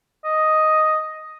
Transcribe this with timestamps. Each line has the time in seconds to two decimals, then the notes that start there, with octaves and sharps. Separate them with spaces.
0.25 D#5